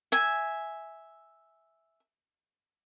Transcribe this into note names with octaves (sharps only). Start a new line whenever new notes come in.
E5 G#5